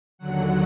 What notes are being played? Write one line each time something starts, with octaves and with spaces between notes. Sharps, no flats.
D#2 D3 F#3 F#5